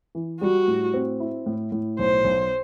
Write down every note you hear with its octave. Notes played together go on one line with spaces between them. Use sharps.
E3
G3 F#4
A2
C4
E4
A2
A2
B1 C5
B1